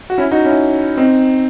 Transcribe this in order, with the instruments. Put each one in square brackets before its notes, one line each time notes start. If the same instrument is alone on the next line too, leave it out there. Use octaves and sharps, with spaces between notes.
[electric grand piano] F#4
C#4 E4
D#4 F#4
C#4 E4
C4 D#4